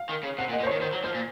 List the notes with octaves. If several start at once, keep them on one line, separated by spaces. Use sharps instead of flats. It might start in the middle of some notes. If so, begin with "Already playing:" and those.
Already playing: F5
D#3
C#3
C3 F#5
A#2
D#5
A#2
C5
D#3 C#5
D#3 C5
F#3
F3 C5
A#2